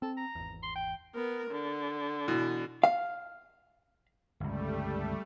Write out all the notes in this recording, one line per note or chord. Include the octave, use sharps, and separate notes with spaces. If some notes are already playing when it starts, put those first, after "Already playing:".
C4 A4
A#5
G#1 E2
C6
G5
B3 A#4
D3
B2 E3
F5
G1 C#2 G3 A3